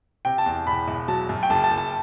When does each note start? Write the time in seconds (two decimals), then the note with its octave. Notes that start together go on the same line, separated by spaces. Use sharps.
0.25 C3 G5
0.38 A5
0.46 E2
0.67 E1 B5
0.88 E1
1.08 F#3 A5
1.29 F#2
1.43 G5
1.50 F#1 A5
1.64 A5
1.71 F#1
1.77 A5